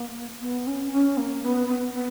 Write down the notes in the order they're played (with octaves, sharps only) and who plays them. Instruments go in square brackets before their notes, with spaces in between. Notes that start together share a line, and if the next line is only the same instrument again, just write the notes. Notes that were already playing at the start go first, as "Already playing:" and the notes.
Already playing: [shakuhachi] A#3
B3
C#4
C#4
A#3
B3
B3
B3